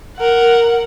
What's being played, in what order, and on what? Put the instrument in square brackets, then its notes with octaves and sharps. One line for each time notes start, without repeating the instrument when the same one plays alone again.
[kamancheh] A#4 F#5